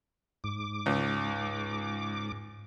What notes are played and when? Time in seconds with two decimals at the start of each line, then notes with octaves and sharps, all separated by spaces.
0.44 G#2 D6
0.86 C#2